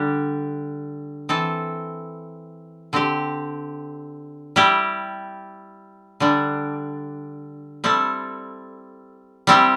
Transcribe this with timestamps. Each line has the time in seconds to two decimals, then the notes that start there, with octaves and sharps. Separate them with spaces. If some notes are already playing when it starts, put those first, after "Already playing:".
Already playing: D3 G3 D4 G4
1.29 E3 C4 A4
2.93 D3 C4 G4
4.56 G3 E4 G4
6.20 D3 G3 D4
7.84 G3 C4 E4 A4
9.47 G3 C4 E4 G4